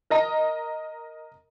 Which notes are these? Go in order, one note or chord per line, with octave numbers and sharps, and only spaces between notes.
A#4 D#5 A#5